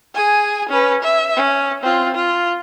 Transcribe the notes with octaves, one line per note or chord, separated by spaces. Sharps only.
G#4 G#5
C#4 B4
E5
C#4
C4 F4
F4